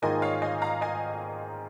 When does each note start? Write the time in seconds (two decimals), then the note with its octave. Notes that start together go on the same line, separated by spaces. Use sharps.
0.02 G#2 D#3 A#3 F4 D#5 G#5
0.22 C#5 F5
0.42 D#5 G#5
0.62 F5 A#5
0.81 D#5 G#5